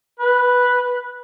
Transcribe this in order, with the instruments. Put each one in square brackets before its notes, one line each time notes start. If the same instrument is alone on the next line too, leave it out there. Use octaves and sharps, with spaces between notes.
[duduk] B4